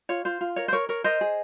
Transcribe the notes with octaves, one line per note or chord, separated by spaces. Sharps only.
F4 C#5
F4 C5
F4
A#4 C#5
C5
A#4 C#5
A#4 C#5
A#4 C5 D#5
G#4